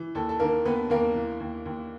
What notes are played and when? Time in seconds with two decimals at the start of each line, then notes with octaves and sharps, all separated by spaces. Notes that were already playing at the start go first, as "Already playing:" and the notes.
Already playing: E3
0.15 D#2 A4
0.29 A4
0.40 D#3 A#3 A#4
0.65 D#2 B3 B4
0.90 D#2 A#3 A#4
1.15 E3
1.40 D#2
1.66 D#2